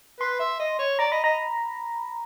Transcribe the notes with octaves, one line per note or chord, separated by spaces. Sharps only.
B4 C6
E5
D#5
C#5
D5 A#5
D#5 B5
D#5 A#5